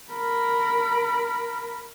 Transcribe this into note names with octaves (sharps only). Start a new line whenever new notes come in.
A#4 B5